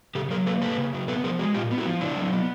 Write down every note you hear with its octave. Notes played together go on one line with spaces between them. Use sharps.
C#3 G4 A4
F#3 G#4 A#4
A#3 A4 B4
C#3 A4 B4
C#3
F#3
B3 A4 B4
F3 G#4 A#4
G#3 F#4 G#4
A#2 F4 G4
B3
E4 F#4
F3
C#3 D4 E4
F#3
B3